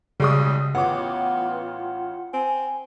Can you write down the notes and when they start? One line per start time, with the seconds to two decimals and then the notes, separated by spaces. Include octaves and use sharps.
0.20 B1 C#3 G3 G#3 D#6
0.75 A1 B3 F4 F#5 D6
2.33 C4 G#5